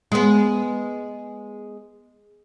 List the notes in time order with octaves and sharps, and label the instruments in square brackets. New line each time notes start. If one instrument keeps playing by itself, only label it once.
[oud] G#3 B3